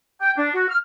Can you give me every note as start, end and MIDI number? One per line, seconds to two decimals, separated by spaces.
0.21 0.32 79
0.37 0.51 62
0.54 0.69 66
0.69 0.77 89